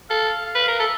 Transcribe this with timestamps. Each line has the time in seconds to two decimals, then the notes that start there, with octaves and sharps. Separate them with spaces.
0.10 A4 F5
0.28 F5
0.45 F5
0.55 B4
0.63 A#4 F5
0.80 A4 E5